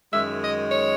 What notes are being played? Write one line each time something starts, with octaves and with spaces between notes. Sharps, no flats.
F#2 D#3 G#3 E5
D#5
C#5